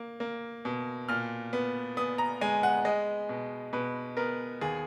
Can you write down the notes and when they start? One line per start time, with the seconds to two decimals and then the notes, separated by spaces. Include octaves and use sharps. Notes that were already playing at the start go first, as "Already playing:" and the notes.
Already playing: A#3
0.20 A#3
0.65 B2
1.09 A#2 F6
1.53 B3
1.97 B3 D#6
2.18 A#5
2.41 G#3 G#5
2.63 F#5
2.85 G#3 D#5
3.29 B2
3.73 B2 B4
4.17 B3 A#4
4.61 D#2 G#4